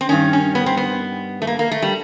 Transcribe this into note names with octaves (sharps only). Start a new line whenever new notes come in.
C4
G2 D#3 C#4
C#4
B3
C4
B3
A3
A#3
A#3
A3
G3